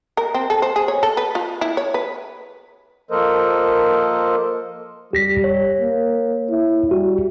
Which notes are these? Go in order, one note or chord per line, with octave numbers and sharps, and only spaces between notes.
A#4
C4
A4
C5
G#4
C#5
A4
B4
F4
E4
C#5
B4
F3 A#3 A4 A#4 C5 D#5
G3 G4 A#6 B6
C#5
A#3
E4
G3 F#4